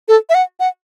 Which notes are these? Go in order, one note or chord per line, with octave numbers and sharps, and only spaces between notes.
A4
E5
F#5
F#5